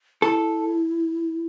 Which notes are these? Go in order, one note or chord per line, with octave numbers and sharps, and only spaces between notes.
E4 A4